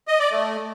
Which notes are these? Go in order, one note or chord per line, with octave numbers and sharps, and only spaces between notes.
D#5
D5
A3